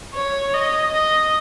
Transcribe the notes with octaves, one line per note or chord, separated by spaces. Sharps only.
C#5
D#5
D#5